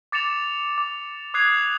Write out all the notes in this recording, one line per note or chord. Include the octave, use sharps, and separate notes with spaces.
D6 A6 C#7 E7 F7
D6
D6 D#6 F#6 G#6 C7 F7